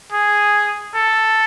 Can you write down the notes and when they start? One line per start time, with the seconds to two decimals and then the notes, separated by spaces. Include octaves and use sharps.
0.12 G#4
0.95 A4